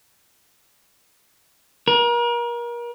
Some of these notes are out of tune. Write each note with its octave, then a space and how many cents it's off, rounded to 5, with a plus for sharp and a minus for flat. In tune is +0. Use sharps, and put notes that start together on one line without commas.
A#4 +35